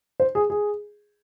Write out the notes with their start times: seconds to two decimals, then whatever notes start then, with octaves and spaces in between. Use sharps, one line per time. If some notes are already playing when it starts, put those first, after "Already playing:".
0.20 C5
0.35 G#4
0.50 G#4